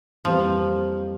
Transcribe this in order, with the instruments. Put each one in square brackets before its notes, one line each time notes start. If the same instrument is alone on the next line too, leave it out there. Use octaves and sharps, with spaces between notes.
[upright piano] F2 E3 G3 A#3 [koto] F3